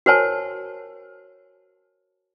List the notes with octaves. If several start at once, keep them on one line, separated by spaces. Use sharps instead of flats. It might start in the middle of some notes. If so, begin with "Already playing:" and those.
F#4 A#4 C5 C#5 G#5 A5